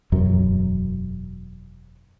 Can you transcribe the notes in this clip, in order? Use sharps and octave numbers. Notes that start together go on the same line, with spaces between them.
E1 F#2 F#3